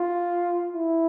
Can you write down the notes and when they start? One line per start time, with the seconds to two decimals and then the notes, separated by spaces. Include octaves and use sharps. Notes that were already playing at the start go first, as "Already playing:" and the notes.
Already playing: F4
0.72 E4